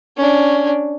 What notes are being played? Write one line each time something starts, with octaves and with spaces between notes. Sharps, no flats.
C#4 D4